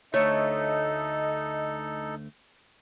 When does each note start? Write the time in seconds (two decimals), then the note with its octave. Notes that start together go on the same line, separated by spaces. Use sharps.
0.14 D2 A3 D#4 A4 C#5 D#5